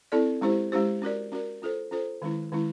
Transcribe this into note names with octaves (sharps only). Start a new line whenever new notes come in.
C4 E4 A4 D5
G#3 C#4 E4 G4 C5
G#3 C#4 E4 G4 C5
C#4 F#4 A#4 D5
C#4 F#4 A#4 D5
C#4 F4 A4 C5
C#4 F4 A4 C5
D#3 G#3 C#4 E4
D#3 G#3 C#4 E4